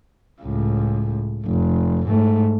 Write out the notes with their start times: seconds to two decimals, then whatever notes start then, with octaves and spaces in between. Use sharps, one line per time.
0.42 C#2 A2
1.46 F1
2.07 G#2 A3